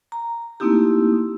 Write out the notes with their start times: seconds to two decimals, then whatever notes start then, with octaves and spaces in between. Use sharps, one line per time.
0.12 A#5
0.60 A3 A#3 C4 D#4 E4 G4